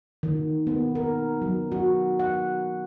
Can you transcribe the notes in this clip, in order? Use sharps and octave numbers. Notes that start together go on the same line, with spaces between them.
D#3
B3
A#4
F#3
F#4
F#5